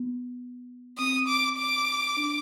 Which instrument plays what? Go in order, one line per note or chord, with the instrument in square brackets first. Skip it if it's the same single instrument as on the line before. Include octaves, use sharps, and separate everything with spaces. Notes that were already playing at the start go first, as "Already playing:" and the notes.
Already playing: [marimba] B3
[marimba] C4 [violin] D#6
[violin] D6
D6
[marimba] D4